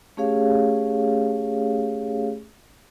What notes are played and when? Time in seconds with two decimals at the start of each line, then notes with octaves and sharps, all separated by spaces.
0.17 A3 C#4 G4 G#4 C#5 F5